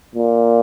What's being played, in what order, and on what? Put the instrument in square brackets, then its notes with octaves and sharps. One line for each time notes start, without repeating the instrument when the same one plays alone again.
[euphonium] A#2